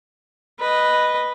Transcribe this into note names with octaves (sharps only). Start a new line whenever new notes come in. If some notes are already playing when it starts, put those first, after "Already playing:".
B4 D#5